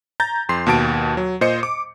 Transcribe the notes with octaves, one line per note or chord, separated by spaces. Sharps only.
A#5 G6 A6
F2 C6 C7
D#2 B2 A5 D7
F#3
A#2 C5 D#5 C#7
D6